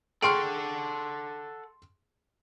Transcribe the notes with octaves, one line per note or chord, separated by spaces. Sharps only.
G#4 A4 F#5 G5 C6 C#6 F6 D7